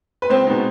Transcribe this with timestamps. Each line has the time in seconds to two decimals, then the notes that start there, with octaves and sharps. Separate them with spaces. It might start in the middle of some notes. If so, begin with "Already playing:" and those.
0.22 B4
0.30 C#2 C4 C5
0.47 B2 G#3 B3 D#4